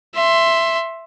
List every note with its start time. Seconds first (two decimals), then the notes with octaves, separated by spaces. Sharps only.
0.15 E5 C6